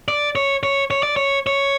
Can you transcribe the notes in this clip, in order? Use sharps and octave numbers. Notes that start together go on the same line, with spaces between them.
D5
C#5
C#5
C#5
D5
C#5
C#5